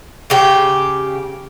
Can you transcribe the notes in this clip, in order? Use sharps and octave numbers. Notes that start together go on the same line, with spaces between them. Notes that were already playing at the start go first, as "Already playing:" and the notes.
C#3 G4